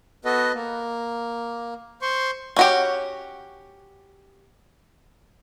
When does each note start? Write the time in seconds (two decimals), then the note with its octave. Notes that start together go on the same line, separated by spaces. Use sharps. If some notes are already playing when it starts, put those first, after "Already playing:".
0.25 B3 F#4 A4 B4 D#5
0.54 A#3
2.02 C5 C6 C#6
2.57 C#4 F#4 G4